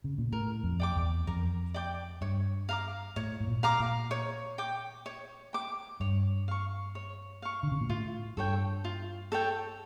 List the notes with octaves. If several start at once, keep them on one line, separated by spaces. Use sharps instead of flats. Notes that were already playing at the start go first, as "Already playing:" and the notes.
C#3
A#2
A2 A#4
F2
D5 G5 D6
E2
F2 A#4
D5 G5 D6
G2 C#5
F5 A#5 D6
A2 C#5
A2
A#2
F5 A#5 D6
A#2
C#5
G5 D6
C#5
G5 D6
G2 C#5
F5 C#6
C#5
F5 C#6
D3
C#3
A#2
A2 F4
G2 A4 C#5 G5
F4
A4 C#5 G5